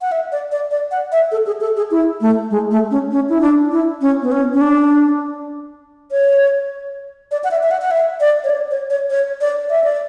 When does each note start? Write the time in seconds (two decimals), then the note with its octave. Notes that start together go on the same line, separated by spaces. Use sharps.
0.01 F#5
0.12 E5
0.32 D5
0.52 D5
0.71 D5
0.91 F#5
1.12 E5
1.32 A4
1.46 G#4
1.61 A4
1.77 G#4
1.91 E4
2.21 A3
2.51 G#3
2.71 A3
2.91 C#4
3.11 C#4
3.29 E4
3.41 D4
3.72 E4
4.01 C#4
4.22 B3
4.32 C#4
4.53 C#4
4.61 D4
6.12 C#5
7.31 D5
7.44 F#5
7.51 E5
7.63 E5
7.71 F#5
7.82 F#5
7.91 E5
8.20 D5
8.44 C#5
8.50 D5
8.71 C#5
8.90 C#5
9.10 C#5
9.41 D5
9.70 E5
9.84 D5